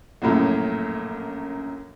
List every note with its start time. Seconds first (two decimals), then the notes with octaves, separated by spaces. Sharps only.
0.22 A#1 F#2 A2 C#3